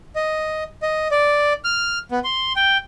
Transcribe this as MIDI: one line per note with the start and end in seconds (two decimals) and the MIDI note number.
0.16 0.64 75
0.82 1.08 75
1.11 1.53 74
1.64 1.99 89
2.12 2.19 59
2.24 2.53 84
2.56 2.78 79